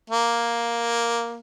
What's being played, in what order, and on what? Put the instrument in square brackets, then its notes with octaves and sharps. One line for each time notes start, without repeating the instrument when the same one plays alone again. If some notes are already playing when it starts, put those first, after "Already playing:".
[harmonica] A#3